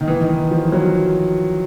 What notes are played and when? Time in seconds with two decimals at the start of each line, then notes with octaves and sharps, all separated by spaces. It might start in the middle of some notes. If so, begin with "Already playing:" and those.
0.01 D#3
0.08 E3
0.21 D#3
0.29 E3
0.51 F3
0.72 F#3